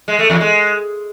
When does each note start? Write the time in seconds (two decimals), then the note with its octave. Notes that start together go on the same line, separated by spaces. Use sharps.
0.08 G#3
0.19 A3
0.30 E2
0.41 G#3